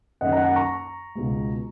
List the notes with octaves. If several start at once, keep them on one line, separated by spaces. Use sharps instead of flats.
F#2 D#3 A#3 D#5 F#5
F#5 A#5
F#5 A#5
A#5 C#6
C#2 B2 G#3